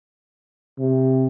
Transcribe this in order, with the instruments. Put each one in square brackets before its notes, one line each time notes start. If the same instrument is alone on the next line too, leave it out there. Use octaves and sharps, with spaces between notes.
[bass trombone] C3